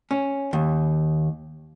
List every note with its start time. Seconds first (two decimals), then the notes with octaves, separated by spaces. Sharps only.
0.11 C#4
0.53 D#2